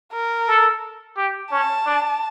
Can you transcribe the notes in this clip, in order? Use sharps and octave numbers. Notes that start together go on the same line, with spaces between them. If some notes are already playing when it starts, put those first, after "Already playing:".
A#4
A4
G4
C#4 A5
D4